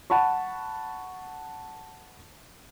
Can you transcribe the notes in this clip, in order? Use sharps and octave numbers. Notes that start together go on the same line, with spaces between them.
F#5 A5 B5 C#6